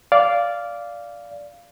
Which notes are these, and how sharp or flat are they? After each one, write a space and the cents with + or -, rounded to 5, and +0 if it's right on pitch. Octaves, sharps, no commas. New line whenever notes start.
D5 -10 F5 -5